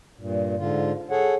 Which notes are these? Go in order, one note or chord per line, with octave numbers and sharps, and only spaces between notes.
G2 A#2
G#2 D3 F4
G#4 A4 C#5 F#5